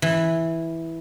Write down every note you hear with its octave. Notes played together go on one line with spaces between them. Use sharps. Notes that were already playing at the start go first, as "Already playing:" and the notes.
E3